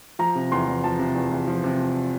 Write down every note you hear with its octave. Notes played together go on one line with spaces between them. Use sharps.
F3 A#5
C3
E2 C6
E2
F3 A5
C3
E2
E2
F3
C3